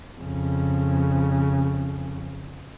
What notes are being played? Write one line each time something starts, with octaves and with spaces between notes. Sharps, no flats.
F2 C#3